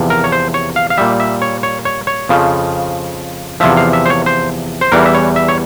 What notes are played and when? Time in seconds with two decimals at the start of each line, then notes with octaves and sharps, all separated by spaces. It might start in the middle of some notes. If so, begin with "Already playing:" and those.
Already playing: E2 C3 F3
0.10 A#4
0.24 C#5
0.32 C5
0.54 C#5
0.76 F5
0.90 F5
0.98 A#2 G3 E5
1.20 E5
1.42 C#5
1.63 C#5
1.85 C#5
2.07 C#5
2.29 F2 C#3 F3
3.60 E2 C3 F3 E5
3.77 F5
3.93 E5
4.06 C5
4.10 C#5
4.26 C5
4.81 C5
4.92 E2 E3 G3 A#4
5.06 E5
5.14 C#5
5.36 E5
5.49 C#5